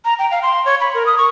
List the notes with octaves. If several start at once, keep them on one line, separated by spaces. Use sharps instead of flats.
A#5
G5
F5
C6
C#5
B5
A#4
D#6
C#6